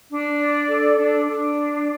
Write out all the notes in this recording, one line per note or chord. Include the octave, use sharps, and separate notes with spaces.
D4
D5
A4
D4
D4
D5